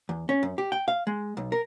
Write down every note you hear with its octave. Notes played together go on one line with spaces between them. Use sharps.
E2
C#4
F#2
G4
G5
F5
G#3
B1
A#4